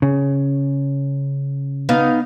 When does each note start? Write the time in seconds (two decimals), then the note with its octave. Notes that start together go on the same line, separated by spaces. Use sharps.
0.02 C#3
1.89 B3 D#4 F5